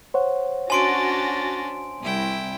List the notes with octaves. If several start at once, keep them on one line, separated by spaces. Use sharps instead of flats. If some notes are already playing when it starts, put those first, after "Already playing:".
C5 C#5 F#5
C#4 D4 F#4 G#5 C6 A6 A#6 D7
C2 E4 G5